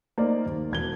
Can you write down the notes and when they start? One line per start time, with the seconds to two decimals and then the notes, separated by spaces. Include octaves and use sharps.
0.18 A#3 D#4 C5 D5
0.46 D#2
0.71 E1 G#6 G7